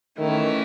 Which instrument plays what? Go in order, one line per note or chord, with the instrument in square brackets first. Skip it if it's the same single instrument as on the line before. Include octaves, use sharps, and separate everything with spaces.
[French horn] D#3 [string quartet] E3 A3 C#4 E4